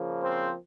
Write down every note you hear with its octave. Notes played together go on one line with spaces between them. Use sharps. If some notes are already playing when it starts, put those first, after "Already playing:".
Already playing: C#3 F3 A#3
C4 C5